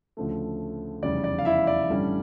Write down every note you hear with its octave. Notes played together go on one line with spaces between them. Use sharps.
D2 C#3 F3 A3
F1 E2 C#3 G3 D5
D5
F5
E4 E5
D5
A1 G2 D3 G3 C#4